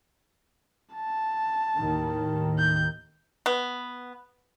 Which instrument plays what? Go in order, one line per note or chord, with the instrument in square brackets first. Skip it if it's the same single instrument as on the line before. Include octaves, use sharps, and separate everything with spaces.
[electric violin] A5
[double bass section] D#2 A2 D#3
[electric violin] G6
[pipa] B3